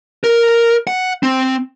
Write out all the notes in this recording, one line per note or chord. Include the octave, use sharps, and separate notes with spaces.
A#4
F#5
C4